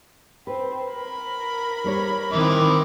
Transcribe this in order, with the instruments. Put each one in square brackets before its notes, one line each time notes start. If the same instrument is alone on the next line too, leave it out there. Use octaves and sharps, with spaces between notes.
[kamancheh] C4 [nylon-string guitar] B4
[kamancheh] A#4 B5
[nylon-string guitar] G3 C5 C#5
[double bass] D#3 C4 [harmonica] E3 E4 D6